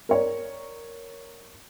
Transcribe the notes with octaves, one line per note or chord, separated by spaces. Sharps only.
A#4 C#5 D5